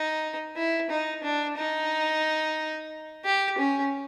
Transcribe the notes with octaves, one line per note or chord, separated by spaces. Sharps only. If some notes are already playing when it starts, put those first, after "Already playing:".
Already playing: D#4
E4
D#4
D4
D#4
G4
C#4